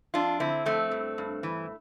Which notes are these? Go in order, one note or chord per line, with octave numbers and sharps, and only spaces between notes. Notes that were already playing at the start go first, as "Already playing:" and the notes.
F2 D4 F4
D3 C4 E4
F2 A3 C4
G2
G2
E3